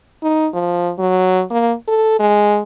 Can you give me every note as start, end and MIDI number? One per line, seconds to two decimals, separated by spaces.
0.23 0.48 63
0.54 0.92 53
0.99 1.43 54
1.50 1.74 58
1.88 2.14 69
2.20 2.61 56